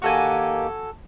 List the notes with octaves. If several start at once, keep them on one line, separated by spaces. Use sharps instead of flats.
D#3 A#3 F#4 G4 A4 G#5